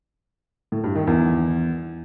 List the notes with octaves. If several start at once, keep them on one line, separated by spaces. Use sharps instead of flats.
A2
G2
D#3
E2